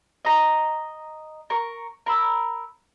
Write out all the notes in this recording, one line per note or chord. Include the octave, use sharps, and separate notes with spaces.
D#5 A#5
A#4 C#6
A#4 B5 E6